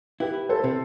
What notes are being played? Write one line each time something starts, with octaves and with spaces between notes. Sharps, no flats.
E4 G4 B4
A4 C5
C3